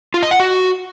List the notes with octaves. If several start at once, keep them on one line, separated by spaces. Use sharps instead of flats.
F4
D#5
F#5
F#4